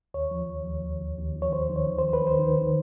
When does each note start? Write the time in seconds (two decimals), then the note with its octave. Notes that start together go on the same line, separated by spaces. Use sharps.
0.14 D#2 C#5
0.31 F3
0.48 D#2
0.65 D#2
0.83 D#2
1.01 D#2
1.18 D#2
1.35 F3
1.42 C#5
1.52 D#2 C5
1.70 D#3
1.76 C#5
1.87 D#2
1.99 C5
2.04 D#2
2.13 B4
2.22 D#3
2.27 C5
2.39 D#3
2.57 D#3